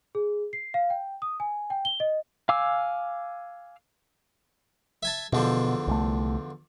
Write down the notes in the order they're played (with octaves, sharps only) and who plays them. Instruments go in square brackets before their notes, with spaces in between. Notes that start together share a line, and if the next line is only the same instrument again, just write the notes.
[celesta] G#4
C7
F5
G5
D#6
G#5
G5
G7
D#5
[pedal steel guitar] F5 G#5 D6 E6
[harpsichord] E5 G#5 A5
[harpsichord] E2 D3 F3 [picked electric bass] B2
[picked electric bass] C2 A3